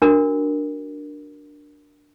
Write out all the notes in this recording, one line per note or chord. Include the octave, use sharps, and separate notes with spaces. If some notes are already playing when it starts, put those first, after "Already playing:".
D4 F#4 A#4